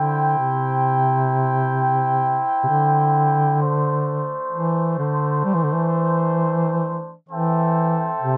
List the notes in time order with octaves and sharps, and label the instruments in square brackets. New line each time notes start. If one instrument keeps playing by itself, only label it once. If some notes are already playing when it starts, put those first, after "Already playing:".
Already playing: [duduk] D3 [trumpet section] E4 C5 G5
[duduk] C3
C3
D3
[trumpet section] A3 D4 C5
[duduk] E3
D3
G3
E3
D3
E3
[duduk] E3 [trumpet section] C4 A4 C5 E5 G5
[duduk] C3